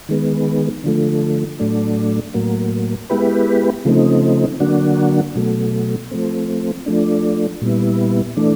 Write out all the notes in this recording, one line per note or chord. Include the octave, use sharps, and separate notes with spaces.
D#3 G#3 B3
D3 F3 A3
A2 F#3 A3 D4
A2 F#3 A#3
G#3 B3 E4 G4 B4
C#3 F3 A3 C4 D#4
D3 F#3 A#3 D4 F#4
B2 F#3 A3
F3 A3 C4
F3 A3 D4
A#2 G3 B3 E4
E3 A3 D4